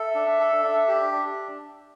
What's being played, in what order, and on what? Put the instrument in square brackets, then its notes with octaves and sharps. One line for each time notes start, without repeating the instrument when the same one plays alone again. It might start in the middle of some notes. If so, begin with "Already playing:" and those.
Already playing: [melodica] A4 [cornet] E5
[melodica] D4
A4
[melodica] D4 [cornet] E5
[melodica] G4
D4